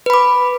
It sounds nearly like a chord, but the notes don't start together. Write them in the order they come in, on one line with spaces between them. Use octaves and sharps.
B4 B5 D6